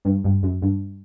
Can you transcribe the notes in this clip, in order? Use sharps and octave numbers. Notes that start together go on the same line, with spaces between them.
G2
G2
F#2
G2